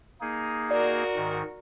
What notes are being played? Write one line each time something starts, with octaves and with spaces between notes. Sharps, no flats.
A#3 D#4 G#4
F#4 A#4 D5
G#2 D#3